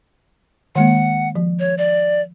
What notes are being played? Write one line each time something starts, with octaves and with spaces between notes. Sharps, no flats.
D#3 G#3 A#3 F#5
F3
C#5
D5